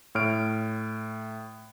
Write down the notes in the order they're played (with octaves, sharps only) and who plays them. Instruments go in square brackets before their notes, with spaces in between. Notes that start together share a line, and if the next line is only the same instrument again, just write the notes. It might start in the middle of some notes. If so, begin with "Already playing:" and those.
[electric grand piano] A2 C#5 F6 D7